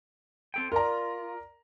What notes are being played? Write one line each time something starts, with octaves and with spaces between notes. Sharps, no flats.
C4 A4 G5
F4 A#4 D5 A#5